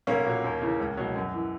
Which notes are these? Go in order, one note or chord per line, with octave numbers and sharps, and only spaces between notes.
B1 A#3 C#4
A#2 F#3
D#2
C#3 E3
C#2
B2 F#3
F#2
E3